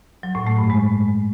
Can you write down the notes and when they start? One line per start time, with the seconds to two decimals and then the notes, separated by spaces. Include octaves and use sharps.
0.23 F#3
0.35 A2
0.47 A3
0.58 G2
0.70 G#3